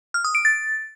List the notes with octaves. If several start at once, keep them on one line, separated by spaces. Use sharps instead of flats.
F6
D#6
D7
A6